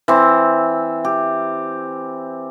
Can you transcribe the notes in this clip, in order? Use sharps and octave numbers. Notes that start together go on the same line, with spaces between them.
E3 C4
G4